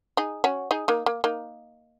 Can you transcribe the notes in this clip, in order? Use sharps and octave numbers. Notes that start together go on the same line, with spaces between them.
D#4 G#4
C#4 F#4
D#4 G#4
A#3 D#4
A#3
A#3 D#4